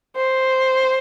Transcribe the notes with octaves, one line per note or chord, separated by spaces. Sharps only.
C5